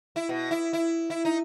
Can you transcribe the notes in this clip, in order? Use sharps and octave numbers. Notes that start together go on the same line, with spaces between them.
E4
B2
E4
E4
E4
D#4